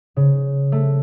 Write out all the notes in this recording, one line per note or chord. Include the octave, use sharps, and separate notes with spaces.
C#3
A3